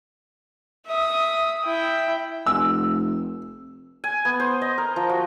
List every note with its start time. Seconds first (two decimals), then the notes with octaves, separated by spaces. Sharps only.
0.86 E5 D#6
1.65 E4 G5
2.47 F1 E6
4.04 G#5
4.25 B3
4.40 C5
4.62 D#5
4.78 A#4
4.96 F3
5.09 F#4